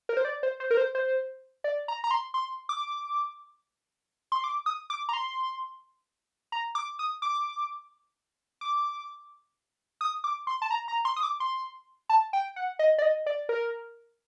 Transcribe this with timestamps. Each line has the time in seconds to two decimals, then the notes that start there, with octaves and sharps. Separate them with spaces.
0.09 A#4
0.17 C5
0.25 D5
0.43 C5
0.60 C5
0.71 A#4
0.77 C5
0.95 C5
1.64 D5
1.88 A#5
2.04 A#5
2.11 C6
2.34 C6
2.69 D6
4.32 C6
4.44 D6
4.66 D#6
4.90 D6
5.09 A#5
5.13 C6
6.52 A#5
6.75 D6
6.99 D#6
7.22 D6
8.61 D6
10.01 D#6
10.24 D6
10.47 C6
10.62 A5
10.71 A#5
10.88 A#5
11.05 C6
11.17 D#6
11.23 D6
11.40 C6
12.09 A5
12.33 G5
12.56 F#5
12.79 D#5
12.98 D5
13.02 D#5
13.26 D5
13.49 A#4